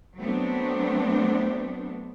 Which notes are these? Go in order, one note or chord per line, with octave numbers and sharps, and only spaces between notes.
F#3 A3 B3 C4 D4